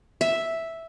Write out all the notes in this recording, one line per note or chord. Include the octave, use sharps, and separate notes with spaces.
E5